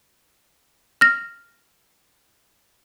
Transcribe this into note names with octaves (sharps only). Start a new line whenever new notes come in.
F6 A#6